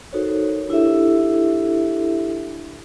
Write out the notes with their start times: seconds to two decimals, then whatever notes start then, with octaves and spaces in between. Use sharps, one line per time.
0.13 D#4 F#4 A4 A#4 C5 C#5
0.69 D4 E4 G4 A4 E5